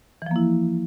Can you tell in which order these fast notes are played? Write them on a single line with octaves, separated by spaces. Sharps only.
E3 F3 A#3 E4